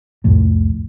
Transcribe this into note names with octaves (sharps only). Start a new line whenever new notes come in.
C2 F2 A2